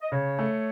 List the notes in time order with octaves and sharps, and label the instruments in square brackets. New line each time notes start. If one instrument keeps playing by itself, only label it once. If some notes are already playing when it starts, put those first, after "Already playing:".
[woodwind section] D#5
[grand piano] C#3 [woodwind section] C#5
[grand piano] A3